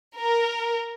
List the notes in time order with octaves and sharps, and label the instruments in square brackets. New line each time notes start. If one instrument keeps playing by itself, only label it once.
[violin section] A#4